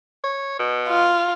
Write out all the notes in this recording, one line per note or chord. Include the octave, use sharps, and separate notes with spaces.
C#5
B2
F4